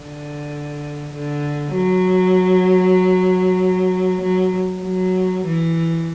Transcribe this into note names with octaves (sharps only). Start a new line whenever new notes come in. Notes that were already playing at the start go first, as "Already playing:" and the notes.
Already playing: D3
D3
F#3
F#3
F#3
E3